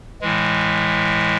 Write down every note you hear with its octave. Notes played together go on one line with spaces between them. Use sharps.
A2 E3 G#3